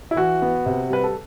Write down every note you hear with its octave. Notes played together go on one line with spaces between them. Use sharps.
E4
E3 F#4
B3
C3
G3 B4
A4